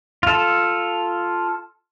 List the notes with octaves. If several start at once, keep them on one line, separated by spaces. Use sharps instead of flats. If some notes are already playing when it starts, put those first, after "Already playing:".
F4 A4